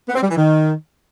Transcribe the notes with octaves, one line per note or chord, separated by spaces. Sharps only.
B3
C4
G3
E3
D#3